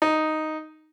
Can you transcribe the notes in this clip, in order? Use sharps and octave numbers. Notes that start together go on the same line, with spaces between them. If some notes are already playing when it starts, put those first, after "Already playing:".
D#4